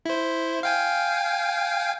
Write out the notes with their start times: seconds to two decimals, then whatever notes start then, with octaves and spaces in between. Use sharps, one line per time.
0.05 E4 C5
0.63 F5 G5 G#5